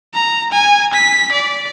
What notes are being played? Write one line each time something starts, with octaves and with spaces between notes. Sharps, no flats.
A#5
G#5
B6
D5